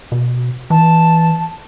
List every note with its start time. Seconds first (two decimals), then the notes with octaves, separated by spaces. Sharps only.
0.12 B2
0.70 E3 A5